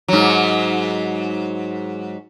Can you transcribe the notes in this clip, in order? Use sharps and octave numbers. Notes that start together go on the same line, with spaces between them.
G#2 F#3